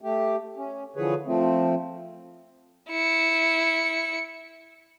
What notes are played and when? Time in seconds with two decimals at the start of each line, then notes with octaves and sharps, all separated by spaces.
0.01 A3 G4
0.57 C#4
0.96 D3 E3 F3 G#4 B4 C#5
1.26 F3 A3 C4
2.91 E4 C#7